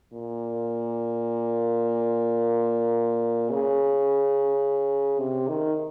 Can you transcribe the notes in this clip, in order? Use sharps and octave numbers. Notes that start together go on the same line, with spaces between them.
A#2
C#3
C3
D#3